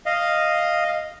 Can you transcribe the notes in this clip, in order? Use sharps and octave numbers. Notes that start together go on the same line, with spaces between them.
D#5 F5